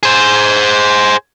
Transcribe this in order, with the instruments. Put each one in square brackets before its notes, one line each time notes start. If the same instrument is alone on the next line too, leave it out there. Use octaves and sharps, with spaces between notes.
[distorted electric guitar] G#4 C5